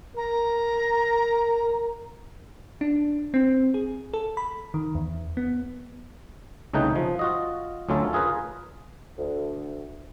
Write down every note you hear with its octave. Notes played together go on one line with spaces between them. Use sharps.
A#4 A#5
D4
C4
G#4
A4
B5
D#3
E2
B3
C2 C#3 A3 D#4 B4 G5
F3
F4 F#4 D#5
D2 F#3 C#4 F4 A4 E5
F4 G#4 A#4 B4
D2